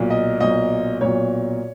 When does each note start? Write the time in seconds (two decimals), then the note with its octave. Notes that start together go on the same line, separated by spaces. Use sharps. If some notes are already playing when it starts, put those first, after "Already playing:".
Already playing: B1 A#2
0.10 D#5
0.40 B1 A#2 D#5
1.01 B1 A#2 C#5